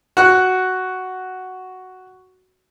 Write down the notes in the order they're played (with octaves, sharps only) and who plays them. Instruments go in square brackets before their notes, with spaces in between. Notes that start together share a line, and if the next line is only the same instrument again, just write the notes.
[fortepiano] F#4 F#6